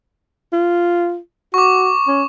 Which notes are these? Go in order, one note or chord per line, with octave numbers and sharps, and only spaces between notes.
F4
F#4 C#6 D6
C#4